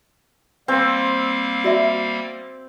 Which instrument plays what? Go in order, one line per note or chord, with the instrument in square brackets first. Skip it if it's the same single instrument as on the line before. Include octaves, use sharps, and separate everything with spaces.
[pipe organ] G3 A#3 F5 [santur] C4
[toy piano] F#4 D5 E5